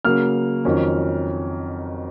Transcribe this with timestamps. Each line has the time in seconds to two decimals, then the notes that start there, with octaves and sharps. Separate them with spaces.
0.05 C#3 F#3 A#3 F6
0.64 F2 D#3 F#3 C#4